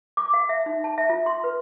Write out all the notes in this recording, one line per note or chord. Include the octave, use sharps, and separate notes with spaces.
D6
F5
E5
D#4
A5
E5
F4
C6
B4